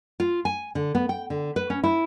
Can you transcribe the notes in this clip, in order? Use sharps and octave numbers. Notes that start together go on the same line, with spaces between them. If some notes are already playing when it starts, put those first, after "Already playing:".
F4
G#5
D3
B3
G5
D3
B4
C#4
E4